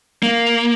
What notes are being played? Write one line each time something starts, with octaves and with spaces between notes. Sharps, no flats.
A#3